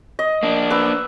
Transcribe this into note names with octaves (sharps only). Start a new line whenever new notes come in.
D#5
A#3 D4
B4 E6